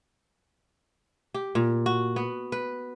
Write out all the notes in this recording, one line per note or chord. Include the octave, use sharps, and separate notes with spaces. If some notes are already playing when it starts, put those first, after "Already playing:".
G4
A#2
F#4
B3
B4